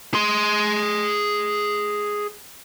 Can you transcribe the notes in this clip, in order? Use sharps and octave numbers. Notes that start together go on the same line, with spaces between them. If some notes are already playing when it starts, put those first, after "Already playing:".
G#4 C6